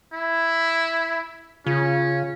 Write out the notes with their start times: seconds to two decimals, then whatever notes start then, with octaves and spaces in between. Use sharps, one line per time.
0.13 E4
1.66 C#3 C#4 F4